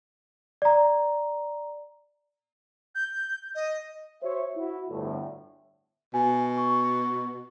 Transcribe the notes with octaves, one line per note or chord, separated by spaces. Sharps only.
D5 A#5
G6
D#5
F#4 C5 C#5 E5
E4 F#4
G1 D2 A2
B2 G#5
C#6